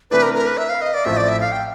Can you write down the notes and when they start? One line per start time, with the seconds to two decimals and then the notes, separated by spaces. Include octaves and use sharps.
0.11 C3 E3 A3 D4 B4
0.22 A#4
0.34 A#4
0.47 B4
0.57 E5
0.69 F5
0.81 D#5
0.94 D5
1.05 A1 A2 F3 A3 C4 E5
1.17 D5
1.29 E5
1.41 F5
1.52 G5